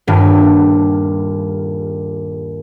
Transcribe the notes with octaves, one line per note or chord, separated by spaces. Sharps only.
D#1 G2